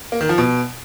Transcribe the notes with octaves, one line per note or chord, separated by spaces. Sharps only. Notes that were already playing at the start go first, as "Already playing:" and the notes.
A#3
D#3
F3
B2